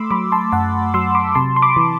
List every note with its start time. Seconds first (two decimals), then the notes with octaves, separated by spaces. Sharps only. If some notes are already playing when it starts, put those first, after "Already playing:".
Already playing: A3 B5 C6 D6 E6
0.11 F#3 B5 D6
0.32 A5 C6
0.52 F#2 F#5 A5
0.94 F#3 C6 E6
1.15 B5 D6
1.35 C3 A5 C6
1.56 C6
1.62 B5 D6
1.77 E3